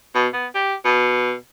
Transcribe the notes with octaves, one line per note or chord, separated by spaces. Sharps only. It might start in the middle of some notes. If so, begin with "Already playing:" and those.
B2
B3
G4
B2